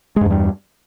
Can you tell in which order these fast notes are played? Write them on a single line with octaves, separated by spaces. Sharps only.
G#3 G2 E2 G3